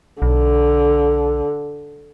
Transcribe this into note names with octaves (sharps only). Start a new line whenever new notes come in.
B1 D3